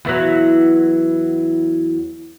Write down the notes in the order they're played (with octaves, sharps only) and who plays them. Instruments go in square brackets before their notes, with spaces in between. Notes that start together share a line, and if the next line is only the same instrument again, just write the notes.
[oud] E2 E3 F#3